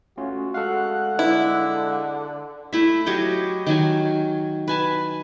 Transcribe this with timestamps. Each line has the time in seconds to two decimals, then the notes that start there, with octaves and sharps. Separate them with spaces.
0.17 A3 C#4 F4 F#4
0.54 G#3 A4 F5 F#5 F#6
1.19 D3 E4
2.73 A3 E4 E5
3.06 F#3 G4 C#5 D#5
3.67 D#3 F#3 G#5
4.68 B4 G#5 A5